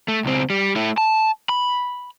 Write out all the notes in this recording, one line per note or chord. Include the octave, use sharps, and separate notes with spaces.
A3
C#2 C4
G3
A3 E4
A5
B5